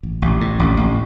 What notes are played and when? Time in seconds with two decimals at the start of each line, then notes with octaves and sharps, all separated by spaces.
0.03 A1
0.22 A1
0.41 A2
0.59 A1
0.77 A1